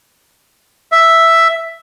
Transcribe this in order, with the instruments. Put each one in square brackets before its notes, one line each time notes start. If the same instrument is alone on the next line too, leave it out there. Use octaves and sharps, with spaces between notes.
[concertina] E5